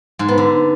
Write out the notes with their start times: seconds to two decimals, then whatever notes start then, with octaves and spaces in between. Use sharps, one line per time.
0.19 G#2
0.28 B3
0.38 D3